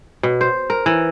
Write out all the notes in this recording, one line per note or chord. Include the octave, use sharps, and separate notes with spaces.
B2
C5
A#4
E3